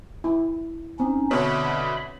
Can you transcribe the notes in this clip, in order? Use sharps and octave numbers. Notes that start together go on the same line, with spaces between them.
E4
C4 C#4 D#4
B2 D3 D4 C#5 E5 B5